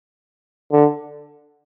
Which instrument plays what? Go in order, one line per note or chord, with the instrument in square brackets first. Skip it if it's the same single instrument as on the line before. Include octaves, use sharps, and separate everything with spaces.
[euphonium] D3